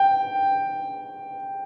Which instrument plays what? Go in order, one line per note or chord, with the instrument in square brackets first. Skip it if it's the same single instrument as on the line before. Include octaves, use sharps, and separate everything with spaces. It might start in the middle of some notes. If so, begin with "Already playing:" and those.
Already playing: [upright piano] G5